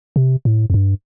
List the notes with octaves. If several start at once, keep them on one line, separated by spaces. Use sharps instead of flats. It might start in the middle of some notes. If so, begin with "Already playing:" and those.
C3
A2
F2
G2